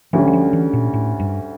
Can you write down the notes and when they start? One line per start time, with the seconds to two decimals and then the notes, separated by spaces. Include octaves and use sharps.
0.13 D2 D3 F3 G3 C#4
0.27 E3
0.33 F3
0.53 E3
0.73 A#2
0.94 A2
1.20 G2